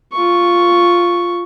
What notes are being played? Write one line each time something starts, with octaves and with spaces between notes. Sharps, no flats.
F4 C#6